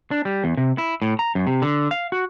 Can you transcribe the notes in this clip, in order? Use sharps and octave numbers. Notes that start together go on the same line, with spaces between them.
D4
G3
E2
C3
E4
A2
A#5
F#2
C3
D3
F5
F#4